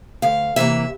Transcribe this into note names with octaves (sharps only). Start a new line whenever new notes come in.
D2 F5
C3 E3 A#3 E5